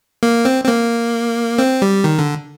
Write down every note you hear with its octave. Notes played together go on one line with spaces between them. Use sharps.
A#3
C4
C4
A#3
C4
G3
D#3
D3